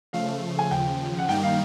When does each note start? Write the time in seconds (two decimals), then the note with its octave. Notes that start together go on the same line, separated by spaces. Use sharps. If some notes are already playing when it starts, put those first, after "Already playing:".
0.13 C#3 F3 A3 F5
0.59 G#5
0.71 D#2 C#3 F3 G5
1.19 F#5
1.28 G2 D#3 G3 A#3 D#4 G5
1.43 F5